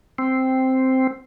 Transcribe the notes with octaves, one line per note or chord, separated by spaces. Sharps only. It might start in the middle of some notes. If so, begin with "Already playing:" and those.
C4